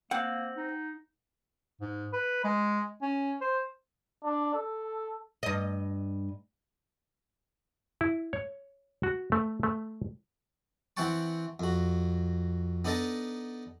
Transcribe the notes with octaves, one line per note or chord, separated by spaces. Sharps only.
A#3 C4 F#5
D#4
G#2
B4
G#3
C#4
C5
D4
A4
G2 D#5
E4
C#5
F#4
A3
A3
E3 C4 F#5 G5 A5 C#6
F2 F#4
B3 D4 D#4 A4 A5 A#5